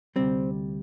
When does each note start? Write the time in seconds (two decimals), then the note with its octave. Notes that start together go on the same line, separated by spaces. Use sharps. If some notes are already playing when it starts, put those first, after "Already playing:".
0.16 D2 C3 G3 C4